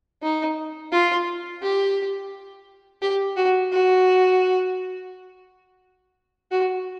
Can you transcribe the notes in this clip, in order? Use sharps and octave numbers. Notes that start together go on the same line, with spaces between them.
D#4
F4
G4
G4
F#4
F#4
F#4